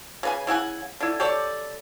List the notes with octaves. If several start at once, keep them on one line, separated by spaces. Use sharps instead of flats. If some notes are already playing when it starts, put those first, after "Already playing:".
C#3 B4 G#5
C#3 E4 F#5 G#5
D3 E4
G4 A4 C#5 D5